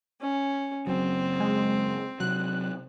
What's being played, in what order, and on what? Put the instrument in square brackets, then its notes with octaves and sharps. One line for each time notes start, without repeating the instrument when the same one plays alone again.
[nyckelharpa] C#4
[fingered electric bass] F#1 C#2 F#3 [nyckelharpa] C4
[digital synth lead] G#3
[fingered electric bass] C3 F#3 [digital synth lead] F#6